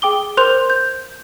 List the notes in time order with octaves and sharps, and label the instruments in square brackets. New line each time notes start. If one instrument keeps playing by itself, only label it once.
[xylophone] G#4 G5 D6 G7
A#4 C5 C6 F#6 G6 F7
G6